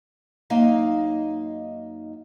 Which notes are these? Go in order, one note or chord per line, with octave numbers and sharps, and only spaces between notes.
F#2 A#3 D#4 D#5 F5